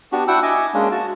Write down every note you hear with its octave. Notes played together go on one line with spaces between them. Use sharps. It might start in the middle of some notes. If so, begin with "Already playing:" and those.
B3 D4 F#4 G4
D4 E4 F#4 F#5 G5 E6
D#5 E5 G#5 D6
G#3 A#3 C#4 D4
F#4 A5